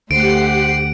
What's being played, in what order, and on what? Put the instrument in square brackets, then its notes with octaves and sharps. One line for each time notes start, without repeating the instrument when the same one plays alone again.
[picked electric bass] D2 [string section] A3 C5 C7 [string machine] G4 F#5 [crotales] D7